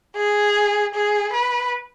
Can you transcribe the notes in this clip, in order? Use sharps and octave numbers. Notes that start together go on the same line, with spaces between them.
G#4
G#4
B4